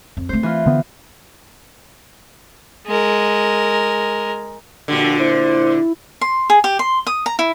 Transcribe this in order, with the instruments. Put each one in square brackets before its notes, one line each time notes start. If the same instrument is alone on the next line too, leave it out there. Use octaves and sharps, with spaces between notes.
[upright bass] F2
[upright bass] A3 C4 [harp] C5
[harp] E3 F4
[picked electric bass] D3 B3
[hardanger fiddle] G#3 A#4
[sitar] A#2 D3 [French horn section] F3 G3 F#4
[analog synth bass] E4 [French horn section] C5
[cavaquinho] C6
G#4
G4
C6
D#6
A#5
E4